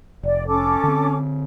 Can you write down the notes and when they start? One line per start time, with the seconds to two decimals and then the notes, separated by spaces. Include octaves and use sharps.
0.23 F1 D5
0.48 C#4 A4 D6
0.84 D3 C4